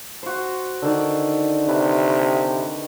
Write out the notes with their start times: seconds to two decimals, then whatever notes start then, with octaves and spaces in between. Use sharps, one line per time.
0.23 F#4 C5
0.82 D3 D#3 D5
1.68 C3 B4